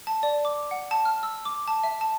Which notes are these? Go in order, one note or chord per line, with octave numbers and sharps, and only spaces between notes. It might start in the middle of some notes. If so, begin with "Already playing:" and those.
A5
D5
D6
F#5
A5
F6
E6
D6
A5
E5
A5